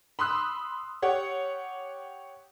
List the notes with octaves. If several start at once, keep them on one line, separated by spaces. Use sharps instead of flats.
B5 C6 D#6 E6 F#6
G4 C#5 F#5